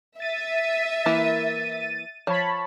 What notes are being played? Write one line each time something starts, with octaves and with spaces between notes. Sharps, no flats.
E5 A6 D#7
E3 A#3 E4
F3 C#5 A5 B5